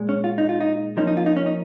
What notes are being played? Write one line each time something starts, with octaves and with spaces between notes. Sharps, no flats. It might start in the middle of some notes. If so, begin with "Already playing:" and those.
Already playing: A#2 G#3
C#4
F4
D#4
F4
D#4
F3 A#3 C#4 D#4
D#4
F4
D#4
C#4
D#4